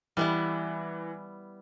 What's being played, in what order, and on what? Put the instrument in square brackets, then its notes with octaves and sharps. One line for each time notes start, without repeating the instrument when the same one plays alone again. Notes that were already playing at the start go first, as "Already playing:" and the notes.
[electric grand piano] E3 [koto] G3 B3 E4